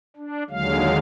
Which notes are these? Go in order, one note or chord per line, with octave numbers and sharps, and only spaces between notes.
D4
D#2 D3 F#3 G#3 F5